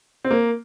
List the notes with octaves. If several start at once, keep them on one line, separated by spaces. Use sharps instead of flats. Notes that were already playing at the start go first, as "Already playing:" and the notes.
C4
A#3